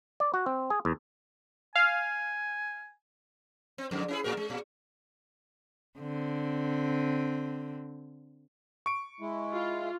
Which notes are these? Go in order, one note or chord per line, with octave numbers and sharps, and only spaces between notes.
D5
F#4
C4
G#4
E2
F5 G#5
C4
F2 G#2 D3
C#4 E4 G#4
A2 F#4 A#4
G#3
A#2
D3 C4
C#6 D7
G#3 E4
F4